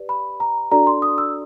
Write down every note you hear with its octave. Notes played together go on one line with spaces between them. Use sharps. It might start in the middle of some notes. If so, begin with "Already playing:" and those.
Already playing: G4 B4 D5
B5
A#5
D4 F#4 A4 D5 A#5
C6
D#6
E6